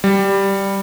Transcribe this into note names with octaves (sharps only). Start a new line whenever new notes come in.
G3